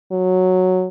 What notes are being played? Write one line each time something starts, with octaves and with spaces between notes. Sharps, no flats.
F#3